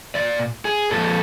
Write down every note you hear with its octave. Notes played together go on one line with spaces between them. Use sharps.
A#2 F3 D5
G#4
A#2 F3 A4